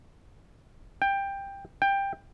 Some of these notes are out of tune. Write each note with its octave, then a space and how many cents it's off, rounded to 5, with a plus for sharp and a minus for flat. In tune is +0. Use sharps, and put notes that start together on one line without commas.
G5 +15
G5 +15